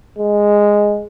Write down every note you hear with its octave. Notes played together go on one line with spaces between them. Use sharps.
G#3